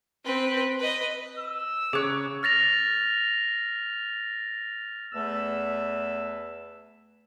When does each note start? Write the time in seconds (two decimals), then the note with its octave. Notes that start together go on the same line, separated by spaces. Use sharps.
0.24 C4 B4
0.79 B4 D#5
1.39 E6
1.93 C#3 G#4 C#5 D6 F#6
2.43 F6 A6 A#6 F7
5.13 E2 A3 B4 E6